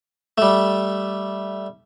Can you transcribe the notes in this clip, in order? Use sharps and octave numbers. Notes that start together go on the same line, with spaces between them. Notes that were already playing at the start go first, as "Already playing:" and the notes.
G3 A3